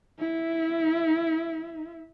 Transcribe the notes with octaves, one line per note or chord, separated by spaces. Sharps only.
E4 E5